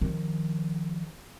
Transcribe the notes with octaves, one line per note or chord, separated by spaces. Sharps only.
D#3 F3